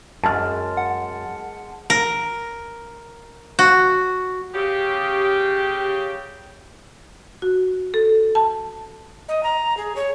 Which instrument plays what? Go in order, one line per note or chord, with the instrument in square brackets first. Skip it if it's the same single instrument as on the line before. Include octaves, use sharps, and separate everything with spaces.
[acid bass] F#2 [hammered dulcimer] G#3 [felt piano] A5 F6
[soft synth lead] F#5
[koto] A#4
F#4
[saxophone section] C#3 G4
[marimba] F#4
A4
A5
[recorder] D#5
A#5
G#4
C#5